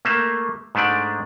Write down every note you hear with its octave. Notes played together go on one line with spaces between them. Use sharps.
A3 A#3 E5
G#2 G#3 A3 D4 D5